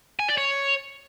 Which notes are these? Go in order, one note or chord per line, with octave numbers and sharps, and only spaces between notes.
G#5
D5
C#5